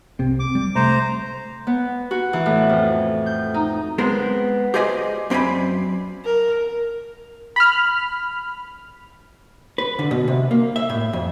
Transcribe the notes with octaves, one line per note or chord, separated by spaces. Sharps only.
C2 C3 C4
D6
G3
C3 A3 C5 A#5
B3
F#4
E3
A2
F2
G6
D#4
G#3 B3 C4 A#4
G4 G#4 C5 D5 D#5 G#5
F#2 C4 D5 G#5 B5
A#4
B5 F6
B4
D3
B2
C3
A#3
E5
A2
F2